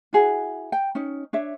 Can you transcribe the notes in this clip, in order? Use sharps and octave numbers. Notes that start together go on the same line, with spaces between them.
E4 F#4 G#4 F#5
G5
C#4 D#4
D4 C#5 E5